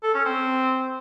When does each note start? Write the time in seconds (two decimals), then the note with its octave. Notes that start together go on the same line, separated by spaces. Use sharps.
0.03 A4
0.14 C#4
0.25 C4